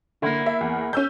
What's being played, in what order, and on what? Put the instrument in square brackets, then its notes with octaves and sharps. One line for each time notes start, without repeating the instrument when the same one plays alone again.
[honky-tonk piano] D3 [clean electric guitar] A#3 E4
[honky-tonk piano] E5
E2
C#4 E6 G6